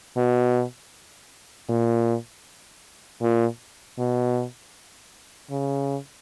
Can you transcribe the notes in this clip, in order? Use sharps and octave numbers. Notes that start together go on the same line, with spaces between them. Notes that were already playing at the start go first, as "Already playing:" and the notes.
B2
A#2
A#2
B2
C#3